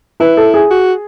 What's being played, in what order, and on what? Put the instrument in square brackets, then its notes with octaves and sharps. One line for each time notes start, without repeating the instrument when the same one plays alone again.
[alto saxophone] E4 [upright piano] B4
[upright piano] A4
G#4
[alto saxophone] F#4